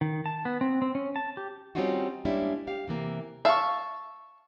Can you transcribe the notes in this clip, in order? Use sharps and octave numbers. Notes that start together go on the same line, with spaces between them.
D#3
A5
B3
C4
C4
C#4
A5
G4
G3 C4 C#4 D#4 F4 F#4
G3 G#3 A#3 C#4 D4 E4
G4 F5
C3 E3 A#3
E5 F5 A5 C#6